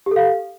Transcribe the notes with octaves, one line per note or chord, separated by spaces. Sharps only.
G4 A4 F5